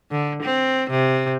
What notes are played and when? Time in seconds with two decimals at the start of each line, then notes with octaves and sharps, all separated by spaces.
0.11 D3
0.43 C4
0.90 C3